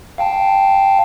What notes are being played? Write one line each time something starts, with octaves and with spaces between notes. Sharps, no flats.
F5 G5 A5